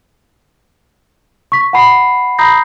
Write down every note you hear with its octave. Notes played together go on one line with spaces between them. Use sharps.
C#6 B6
F#5 A5 B5 C7
A#5 B5 D#6 G6 A#6 C7